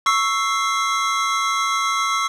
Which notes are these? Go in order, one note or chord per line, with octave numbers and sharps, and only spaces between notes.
C#6 E6 C7